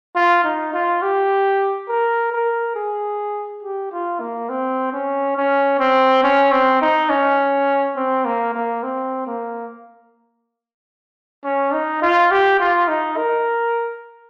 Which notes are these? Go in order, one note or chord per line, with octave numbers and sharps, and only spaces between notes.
F4
D#4
F4
G4
A#4
A#4
G#4
G4
F4
A#3
C4
C#4
C#4
C4
C#4
C4
D#4
C#4
C4
A#3
A#3
C4
A#3
C#4
D#4
F4
G4
F4
D#4
A#4